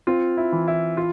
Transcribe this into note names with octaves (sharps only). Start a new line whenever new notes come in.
C4 F4
E4
E3
E4
F4